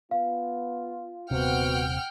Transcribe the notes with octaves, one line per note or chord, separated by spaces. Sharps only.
B3 F4 F5
D#1 C3 B3 C4 F#4 F#5 G5 F6